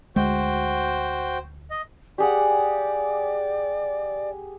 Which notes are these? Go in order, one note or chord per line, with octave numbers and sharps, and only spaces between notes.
D2 G#3 F#4 C5 G5
D#5
G4 G#4 D5 F#5